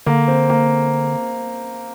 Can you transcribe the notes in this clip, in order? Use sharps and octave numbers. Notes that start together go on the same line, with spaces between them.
D3 A#3
C4
A#3